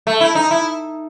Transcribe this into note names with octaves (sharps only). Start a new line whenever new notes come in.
A3
E4
D#4
E4